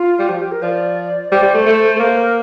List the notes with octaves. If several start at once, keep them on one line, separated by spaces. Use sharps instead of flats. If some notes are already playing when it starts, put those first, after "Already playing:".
Already playing: F4
G3
F3 G4
G4
A#4
F3 D5
G3 C5
G3
A3
A3
A3
A#3 C5
A#4